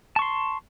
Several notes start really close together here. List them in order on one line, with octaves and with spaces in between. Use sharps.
A5 C#6 C6